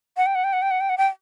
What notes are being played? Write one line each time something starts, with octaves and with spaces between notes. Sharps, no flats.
F#5
G5
F#5
G5
F#5
G5
F#5
G5
F#5
G5